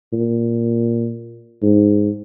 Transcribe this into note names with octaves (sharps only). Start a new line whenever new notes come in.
A#2
G#2